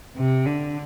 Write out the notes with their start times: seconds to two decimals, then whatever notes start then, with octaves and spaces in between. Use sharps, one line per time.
0.17 C3
0.46 D3